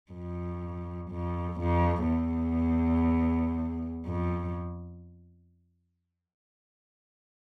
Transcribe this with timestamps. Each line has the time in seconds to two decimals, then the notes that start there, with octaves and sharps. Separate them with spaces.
0.12 F2
1.11 F2
1.60 F2
2.09 E2
4.07 F2